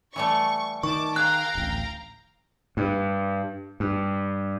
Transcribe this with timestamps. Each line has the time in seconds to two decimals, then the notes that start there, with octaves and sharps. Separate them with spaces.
0.16 E3 G3 A3 C#6
0.83 D#3 A5 C#6 D6
1.16 G#4 F5 G5 A#5 F#6
1.55 D1 A1
2.77 G2
3.80 G2